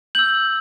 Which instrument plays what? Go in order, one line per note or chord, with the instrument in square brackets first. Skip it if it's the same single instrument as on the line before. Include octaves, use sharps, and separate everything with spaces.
[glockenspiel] E6 G6 F#7